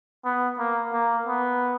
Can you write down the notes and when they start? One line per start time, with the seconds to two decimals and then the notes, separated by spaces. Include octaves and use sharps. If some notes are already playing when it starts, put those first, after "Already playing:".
0.25 B3
0.58 A#3
0.93 A#3
1.27 B3